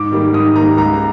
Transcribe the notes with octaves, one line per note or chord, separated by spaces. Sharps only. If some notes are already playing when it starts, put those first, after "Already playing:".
Already playing: G#2 D6
D#3 G3 A#3
G#2 D#6
D#3 G3 A#3 A#5
C#2 A#5